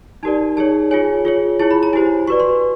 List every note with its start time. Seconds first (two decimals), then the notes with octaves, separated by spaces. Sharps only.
0.23 D#4 G4 A#4 D5 A5
0.57 D#4 G#4 C#5 A5
0.91 F4 G#4 C#5 G#5
1.25 F4 G#4 C#5
1.59 E4 G#4 C#5 A5
1.71 B5
1.83 A#5
1.93 E4 G4 C5 G#5
2.27 F#4 B4 D5 C#6
2.40 C6